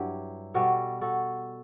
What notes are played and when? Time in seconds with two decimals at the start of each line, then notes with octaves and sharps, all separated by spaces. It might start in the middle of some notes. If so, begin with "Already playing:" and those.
Already playing: G2 F#3 E4 G4
0.54 B2 G3 F#4 A4
1.01 F#4 A4